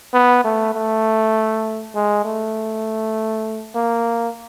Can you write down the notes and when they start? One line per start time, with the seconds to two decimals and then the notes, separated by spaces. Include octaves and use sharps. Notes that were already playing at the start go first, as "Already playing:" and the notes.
0.14 B3
0.44 A3
0.74 A3
1.95 G#3
2.25 A3
3.75 A#3